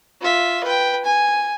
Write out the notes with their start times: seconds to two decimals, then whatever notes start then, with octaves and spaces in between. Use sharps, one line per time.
0.21 F4 E5
0.64 B4 G5
1.05 G#5